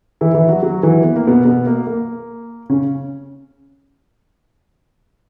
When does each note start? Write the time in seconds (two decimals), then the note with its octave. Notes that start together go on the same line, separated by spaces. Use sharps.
0.21 E3 E4
0.34 E3 E4
0.49 F#3 F#4
0.62 F#3 F#4
0.83 E3 E4
1.04 B3
1.16 A#3
1.27 B2 B3
1.45 B2 B3
1.66 A#3
1.87 A#3
2.70 C#3 C#4